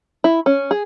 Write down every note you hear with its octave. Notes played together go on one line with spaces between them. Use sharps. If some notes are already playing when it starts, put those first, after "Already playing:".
E4
C#4
G#4